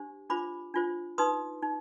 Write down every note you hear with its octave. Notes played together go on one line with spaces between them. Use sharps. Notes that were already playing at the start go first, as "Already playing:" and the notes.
Already playing: D4 G4 C5
D4 F4 C5 B5 D6
D4 F4 C5
D#4 B4 C6 D#6
D#4